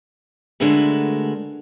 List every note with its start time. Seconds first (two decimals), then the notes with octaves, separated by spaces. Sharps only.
0.60 D3 G#3 A3 F#4 A#4 B4